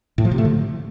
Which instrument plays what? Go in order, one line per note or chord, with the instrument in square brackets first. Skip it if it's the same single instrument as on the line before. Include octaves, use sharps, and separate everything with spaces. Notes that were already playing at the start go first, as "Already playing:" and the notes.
[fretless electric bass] A2
F3
C3
A3
D3